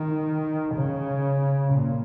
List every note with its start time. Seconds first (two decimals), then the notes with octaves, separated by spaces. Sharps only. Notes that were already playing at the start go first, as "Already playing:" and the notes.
Already playing: D#3
0.75 C#3
1.74 A#2